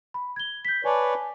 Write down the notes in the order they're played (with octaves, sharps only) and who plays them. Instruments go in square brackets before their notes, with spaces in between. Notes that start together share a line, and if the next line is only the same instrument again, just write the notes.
[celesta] B5
G#6 G7
G6 B6
[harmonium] B4 C#5 D5 [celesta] G#5 A5